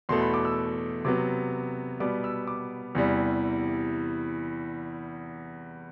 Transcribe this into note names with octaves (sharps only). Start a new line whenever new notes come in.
E2 B2 A3 C6
B5
D6
E6
C3 F#3 B3 D6
B2 G3 B3 D6
E6
D6
E2 C3 E3 G3